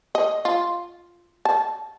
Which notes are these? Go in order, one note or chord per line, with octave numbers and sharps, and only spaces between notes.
D#5
F4
A5